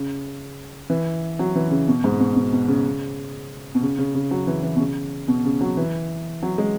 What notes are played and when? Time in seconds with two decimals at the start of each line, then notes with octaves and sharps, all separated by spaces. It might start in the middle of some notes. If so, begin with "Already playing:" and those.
Already playing: C#3
0.90 E3
1.39 F#3
1.56 E3
1.71 C#3
1.88 B2
2.04 G#2
2.20 B2
2.36 B2
2.52 B2
2.68 C#3
3.75 B2
3.82 C#3
3.99 C#3
4.15 C#3
4.31 F#3
4.47 E3
4.63 E3
4.76 B2
4.79 C#3
5.28 B2
5.45 C#3
5.61 F#3
5.77 E3
6.43 F#3
6.58 G#3